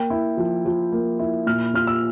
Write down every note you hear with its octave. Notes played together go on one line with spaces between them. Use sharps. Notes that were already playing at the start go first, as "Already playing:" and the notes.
Already playing: A#3 G5
E4
F3
F3
A#3
E4
A#2 F6
F4 F6
E6